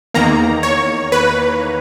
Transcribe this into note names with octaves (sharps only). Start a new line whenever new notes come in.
E2 D#3 A#3 A#5
C#5
B4